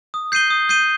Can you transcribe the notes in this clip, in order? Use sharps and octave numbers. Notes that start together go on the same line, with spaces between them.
D#6
G6 C7 D#7 G7
D#6
G6 C7 D#7 G7